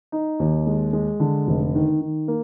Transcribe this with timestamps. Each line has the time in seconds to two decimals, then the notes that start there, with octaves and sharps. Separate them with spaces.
0.12 D#4
0.40 D#2
0.67 G#3
0.93 G#3
1.20 D3
1.47 F1
1.75 D#3
2.01 D#3
2.28 A#3